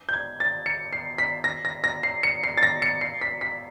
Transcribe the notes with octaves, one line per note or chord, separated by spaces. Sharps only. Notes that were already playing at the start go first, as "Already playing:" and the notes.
G6
G#6
A6
C#7
C7
B6
A#6
A#6
A#6
C7
C#7
C7
A6
A#6
C#7
C7
B6
B6